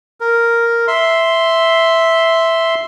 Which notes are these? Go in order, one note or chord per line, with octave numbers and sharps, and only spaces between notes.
A#4
E5 C6